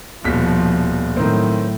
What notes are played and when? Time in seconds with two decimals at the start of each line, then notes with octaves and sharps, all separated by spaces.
0.24 D#1 B2 F3 B6
1.17 A2 D#3 F#3 C4